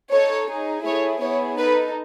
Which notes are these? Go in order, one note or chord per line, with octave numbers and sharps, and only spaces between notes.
D#4 A4 C#5
D#4 G#4
A3 E4 G#4 C#5
B3 E4 G#4 C#5
D#4 A4 B4